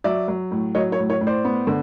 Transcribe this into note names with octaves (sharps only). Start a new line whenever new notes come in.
F#3 D5 E5
F#3
A2
F#3 C#5 D#5
C#5
A2
C#5
A2
C5 D5
B3
D3